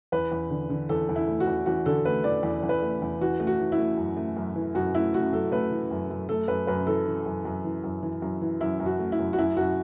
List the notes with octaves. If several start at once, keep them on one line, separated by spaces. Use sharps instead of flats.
E2 B4
E2
D3
D3
E2 A4
E2
E4
A3
F#4
E2
E2 F#4
D3 A4
A3 B4
E2 D5
E2
E2
B4
A3
E2
E3 F#4
A3
F#4
E3
E4
A3
F#2
A3
F#2
E3
F#2 F#4
A3 E4
A3 F#4
F#2 A4
A3 B4
E3
F#2
F#2
A3 A4
F#2 B4
F#2 B4
E3 A4
E3
F#2
F#2
E3
F#2
E3
F#2
E3
F#2 E4
F#2
F#4
A3
E4
F#2
F#4
F#2 E4
F#2 F#4